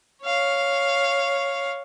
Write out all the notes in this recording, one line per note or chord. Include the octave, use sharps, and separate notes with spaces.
C#5 F5